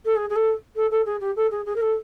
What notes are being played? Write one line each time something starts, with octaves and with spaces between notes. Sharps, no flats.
A4
G#4
G#4
A4
A4
A4
G#4
G4
A4
G#4
G#4
A#4
A4